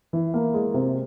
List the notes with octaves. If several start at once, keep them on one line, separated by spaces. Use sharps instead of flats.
E3
A#3
G#3
C3